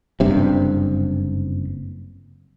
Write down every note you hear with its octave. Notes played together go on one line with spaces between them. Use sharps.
F#1 G2 C3